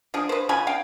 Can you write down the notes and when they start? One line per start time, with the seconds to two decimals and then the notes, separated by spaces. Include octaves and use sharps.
0.14 F3 D4 G#4
0.29 B4 C5
0.49 C#3 F4 G#5 B5
0.67 F5 G5